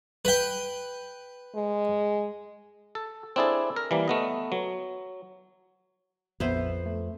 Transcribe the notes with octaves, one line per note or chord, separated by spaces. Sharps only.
B4 G5
G#3
A4
C4 D4 E4 G#4 A4
A#4
E3 G3 A#3
A3 B3 D#5
F#3
A#1 F2 B3 C5 E5
A3